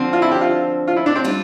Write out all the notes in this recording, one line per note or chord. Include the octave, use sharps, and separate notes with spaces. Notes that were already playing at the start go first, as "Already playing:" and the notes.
Already playing: D3 F3 C4
F4
E4
G4
F4
F4
E4
D4
C4
G3 D4 F4